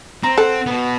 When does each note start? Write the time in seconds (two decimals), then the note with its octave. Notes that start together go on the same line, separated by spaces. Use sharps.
0.23 C4 A#5
0.38 A4 F#5
0.66 B2 B3